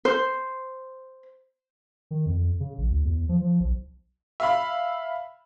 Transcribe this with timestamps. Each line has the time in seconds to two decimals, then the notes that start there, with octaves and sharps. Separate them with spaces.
0.05 C5
2.11 D#3
2.26 F2
2.60 C#3
2.78 A#1
2.91 D2
3.05 E2
3.29 F3
3.41 F3
3.60 B1
4.40 E5 F5 B5